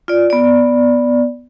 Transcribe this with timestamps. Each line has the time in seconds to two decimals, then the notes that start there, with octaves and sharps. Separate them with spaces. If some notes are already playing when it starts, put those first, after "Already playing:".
0.08 F4 D5
0.30 B3 D5